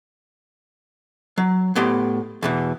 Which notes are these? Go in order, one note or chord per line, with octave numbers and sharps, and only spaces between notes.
F#3
A2 B3 G4 C6
E2 B2 E3